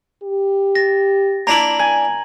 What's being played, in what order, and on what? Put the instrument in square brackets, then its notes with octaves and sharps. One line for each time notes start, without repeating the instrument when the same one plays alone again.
[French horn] G4
[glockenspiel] A6 A#6
[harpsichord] A#3 D4 E4 [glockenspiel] A#5 F#7
[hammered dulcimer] G#5